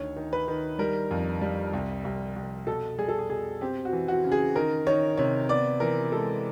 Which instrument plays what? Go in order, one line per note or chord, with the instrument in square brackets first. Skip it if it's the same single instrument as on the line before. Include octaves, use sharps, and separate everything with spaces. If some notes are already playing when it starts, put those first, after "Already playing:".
Already playing: [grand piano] D2 D#3 C#5
D#3
B4
D#3
G3 A#4
F2
G3
C2
C2
C2
B2 A4
G3 G#4
A4
G#4
B2 G#4
C4 G4
F#4
E3
F#4
C#3
G#4
D#3 A#4
D#3 C#5
C3 C#5
B3 D5
E3 A#4
G#3 A4